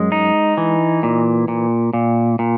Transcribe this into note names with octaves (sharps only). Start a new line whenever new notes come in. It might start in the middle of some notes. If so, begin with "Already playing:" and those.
Already playing: F#2 G#3
D#4
E3
A#2
A#2
A#2
A#2